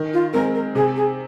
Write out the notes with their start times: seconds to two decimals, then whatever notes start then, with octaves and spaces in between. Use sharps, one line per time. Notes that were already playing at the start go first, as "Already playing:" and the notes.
Already playing: D#3
0.14 F4
0.33 G#3 C4 A#4
0.55 A#4
0.75 C3 G#4
0.96 G#4